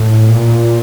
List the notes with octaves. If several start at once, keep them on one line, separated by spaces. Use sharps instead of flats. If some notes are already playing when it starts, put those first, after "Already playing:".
Already playing: A2
A#2